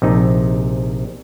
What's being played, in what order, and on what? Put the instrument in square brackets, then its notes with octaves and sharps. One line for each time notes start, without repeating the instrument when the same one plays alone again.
[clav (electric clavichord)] A#1 C3 D#4